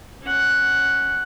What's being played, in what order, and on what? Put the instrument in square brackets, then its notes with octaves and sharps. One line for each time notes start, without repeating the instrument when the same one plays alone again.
[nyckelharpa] C#4 F#5